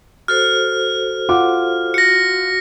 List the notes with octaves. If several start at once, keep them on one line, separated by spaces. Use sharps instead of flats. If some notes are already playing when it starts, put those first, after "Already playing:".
F#4 A4 C5 F6
F4 F#5 D6
F#4 A#6 C#7